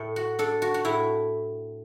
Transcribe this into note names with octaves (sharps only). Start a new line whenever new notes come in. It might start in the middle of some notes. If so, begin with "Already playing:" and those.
Already playing: A2 A4
F#4
D4 A4
F#4
F#4
A2 E4